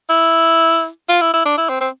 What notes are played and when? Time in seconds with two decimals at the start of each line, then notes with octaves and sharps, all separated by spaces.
0.10 E4
1.09 F4
1.21 E4
1.34 E4
1.46 D4
1.58 E4
1.69 C4
1.81 C4